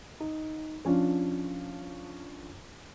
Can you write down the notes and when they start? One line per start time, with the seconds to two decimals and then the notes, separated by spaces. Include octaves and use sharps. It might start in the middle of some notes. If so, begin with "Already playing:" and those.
0.20 D#4
0.85 F3 C#4 D4 F4